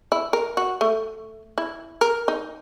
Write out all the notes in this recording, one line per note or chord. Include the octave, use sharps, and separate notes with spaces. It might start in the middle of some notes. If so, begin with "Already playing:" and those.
E4
A#4
F#4
A3
E4
A#4
D#4